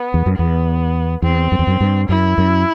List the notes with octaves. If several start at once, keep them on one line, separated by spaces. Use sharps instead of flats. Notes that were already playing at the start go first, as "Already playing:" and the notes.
Already playing: B3
E2
F#2
E2 B3
E2 C4
F#2
E2
F#2
G2
F#2 E4
F#2